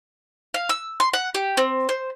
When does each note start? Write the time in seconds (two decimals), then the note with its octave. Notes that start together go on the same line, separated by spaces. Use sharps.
0.54 F5
0.69 E6
1.00 C6
1.13 F#5
1.35 G4
1.57 C4
1.89 C5